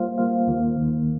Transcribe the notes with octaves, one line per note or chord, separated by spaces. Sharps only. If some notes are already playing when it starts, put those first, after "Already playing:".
Already playing: G3 A#3 F4 C5 F5
G3 A#3 F4 C5 F5
D#2 D#3 A#3
D#2 D#3 A#3